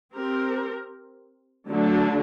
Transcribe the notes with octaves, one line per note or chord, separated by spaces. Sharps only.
C4 G4 A#4
D3 F#3 A3 D4